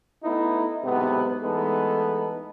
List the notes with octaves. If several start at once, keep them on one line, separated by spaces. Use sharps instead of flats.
A3 B3 D#4 E4
B1 G#2 C3 B3
E3 G#3 A3 B3 D#4 A4